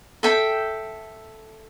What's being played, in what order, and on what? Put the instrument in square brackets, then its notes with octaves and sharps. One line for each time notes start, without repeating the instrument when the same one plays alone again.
[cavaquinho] A4 E5 G5